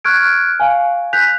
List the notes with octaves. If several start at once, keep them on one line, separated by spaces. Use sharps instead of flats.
C#6 F6 F#6 G#6 D7
F5 G#5
F#6 G6 B6 F7